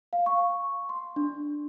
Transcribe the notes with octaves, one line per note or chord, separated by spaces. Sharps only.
F5
C#6
C6
D4